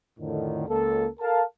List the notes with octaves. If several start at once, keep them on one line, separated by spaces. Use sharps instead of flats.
F2 A2 D3 D#3
C#2 A#3 A4
A4 A#4 F5 A5